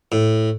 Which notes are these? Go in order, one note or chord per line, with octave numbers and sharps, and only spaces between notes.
A2